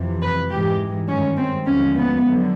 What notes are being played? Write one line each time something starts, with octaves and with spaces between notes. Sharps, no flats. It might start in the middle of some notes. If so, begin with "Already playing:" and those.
Already playing: F2 C3 E3
B4
G#2 E3 G#3 G4
G2 D#3 G#3 C#4
C4
D#2 D3 F3 G#3 C#4
B3
F2 D3 F#3